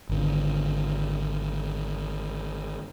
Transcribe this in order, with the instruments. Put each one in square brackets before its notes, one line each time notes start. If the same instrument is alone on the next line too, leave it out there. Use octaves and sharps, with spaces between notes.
[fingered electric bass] G#1 D3